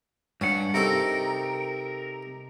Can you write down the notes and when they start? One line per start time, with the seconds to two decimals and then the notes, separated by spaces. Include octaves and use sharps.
0.41 G2 C#4 F#5
0.74 C3 D#4 A4 A#4